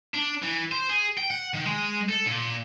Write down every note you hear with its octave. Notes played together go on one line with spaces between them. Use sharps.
D4
E3
C5
G#4
G5
F#5
D#3
G#3
A4
A#2